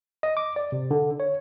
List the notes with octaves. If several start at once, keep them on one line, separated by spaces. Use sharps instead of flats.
D#5
D6
D5
C3
D3
C#5